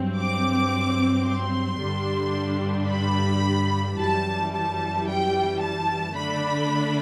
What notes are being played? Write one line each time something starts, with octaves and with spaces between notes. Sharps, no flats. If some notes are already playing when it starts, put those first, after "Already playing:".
Already playing: G2 F#3 C4
D6
C6
G2 D3 G3 D4
B5
F#2 E3 G3 A5
A5
G5
A5
D3 A3 D4 B5